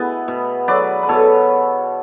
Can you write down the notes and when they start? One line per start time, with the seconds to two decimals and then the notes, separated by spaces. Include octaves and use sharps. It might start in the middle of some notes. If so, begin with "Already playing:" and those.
Already playing: B2 B3 E4 G#4
0.28 B2
0.68 F#3 B4 D5
1.03 B4
1.09 B2 A4 C#5